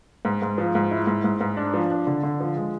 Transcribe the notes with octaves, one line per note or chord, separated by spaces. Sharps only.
G#2
G#2
F3
G#2
E4
G#2
G#2
G#2
D4
F3
D4
D3
D3
F3
G#3